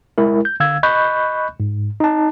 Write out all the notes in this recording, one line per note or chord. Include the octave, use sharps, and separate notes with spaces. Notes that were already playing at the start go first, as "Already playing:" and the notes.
G#3 E4 A#4
G6
D3 F5 E6 G#6
D#5 B5 C#6 F#6 G6
G#2
D#4 A5